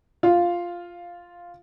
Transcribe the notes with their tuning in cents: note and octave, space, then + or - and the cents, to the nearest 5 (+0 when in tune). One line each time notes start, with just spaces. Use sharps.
F4 +0 F5 +0